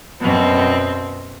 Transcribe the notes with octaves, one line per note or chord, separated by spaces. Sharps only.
F#2 B2 C4